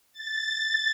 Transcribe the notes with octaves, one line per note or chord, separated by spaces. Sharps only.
A6